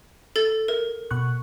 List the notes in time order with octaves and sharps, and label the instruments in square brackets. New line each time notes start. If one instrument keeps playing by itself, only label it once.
[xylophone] A4 A6
A#4
[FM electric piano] B2 C#6 F#6